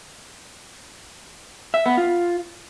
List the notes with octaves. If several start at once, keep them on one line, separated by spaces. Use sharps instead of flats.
E5
B3
F4